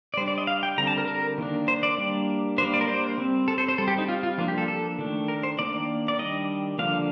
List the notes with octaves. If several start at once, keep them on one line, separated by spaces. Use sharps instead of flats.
D5
G3 D4 C5
D5
D#5
F5
G5
D3 G3 C4 A#5
A5
A#4
A#4
D#3 A#3 D4
C5
D5
G3 A#3 D4
G3 A#3 D4 C5
D5
A#4
C5
G3 C4
A4
C5
C5
G3 C4 A4
G4
D#4
F4
F4
F3 A#3 D4 F4
G4
A4
A4
D#3 A3 D4
A#4
C5
D#3 A#3 D4 D5
D5
D#3 G3 D4 D#5
D3 F3 A#3 D4 F5